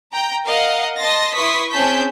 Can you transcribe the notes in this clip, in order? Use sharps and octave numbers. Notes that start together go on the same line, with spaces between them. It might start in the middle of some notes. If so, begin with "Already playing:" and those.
G5 A#5
A#4 D#5 F5 F#5
D#5 A5 C6 A6 A#6
E4 B4 C6 C#6 D#6 B6
C4 C#4 G#4 A5 G6 B6